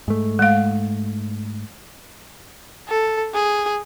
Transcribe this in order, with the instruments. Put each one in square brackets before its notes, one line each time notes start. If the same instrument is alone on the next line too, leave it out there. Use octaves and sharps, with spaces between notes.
[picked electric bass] G#2 A3
[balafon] G#3 F5
[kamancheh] A4
G#4